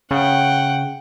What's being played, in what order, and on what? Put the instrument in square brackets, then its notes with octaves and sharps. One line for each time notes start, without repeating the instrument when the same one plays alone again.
[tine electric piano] C#3 [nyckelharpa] F#5 G5